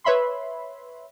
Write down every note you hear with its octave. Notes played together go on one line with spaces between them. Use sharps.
B4 C#5 E5 B5 C6